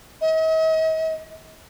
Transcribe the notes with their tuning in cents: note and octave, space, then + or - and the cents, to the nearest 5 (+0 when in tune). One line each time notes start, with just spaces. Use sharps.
D#5 +45